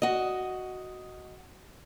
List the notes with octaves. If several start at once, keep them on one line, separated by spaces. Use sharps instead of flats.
F#4 D#5